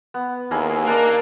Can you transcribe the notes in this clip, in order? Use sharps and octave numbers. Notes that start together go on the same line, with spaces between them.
B3
D#2 A#3 E4 G#4
A#3 D4